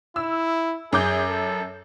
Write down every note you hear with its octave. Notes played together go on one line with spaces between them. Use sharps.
E4 E6
F#2 G#4 D6 G6
A4